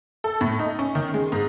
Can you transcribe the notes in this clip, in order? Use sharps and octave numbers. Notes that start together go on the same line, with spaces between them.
A4
A2
D#4
C#4
D#3
G#3
G#2